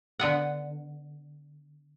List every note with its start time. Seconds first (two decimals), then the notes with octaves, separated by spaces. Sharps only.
0.19 D3 B3 F#5